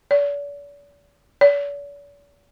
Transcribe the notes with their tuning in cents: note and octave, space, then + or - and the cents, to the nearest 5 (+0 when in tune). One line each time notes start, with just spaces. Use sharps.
D5 -40
D5 -45